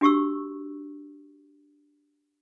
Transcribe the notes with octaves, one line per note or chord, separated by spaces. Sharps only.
D4 F#4 G4 C#6 E6